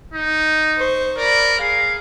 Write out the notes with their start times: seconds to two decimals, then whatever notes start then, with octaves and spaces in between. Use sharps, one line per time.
0.14 D#4
0.77 C5 C#6
1.18 A#4 D5 B5
1.60 G#4 F5